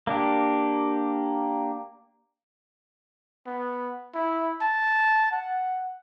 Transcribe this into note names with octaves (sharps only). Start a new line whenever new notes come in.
A#3 D4 G4
B3
E4
A5
F#5